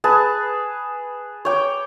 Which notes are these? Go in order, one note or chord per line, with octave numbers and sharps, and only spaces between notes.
G#4 B4 A5
C#5 G5 D6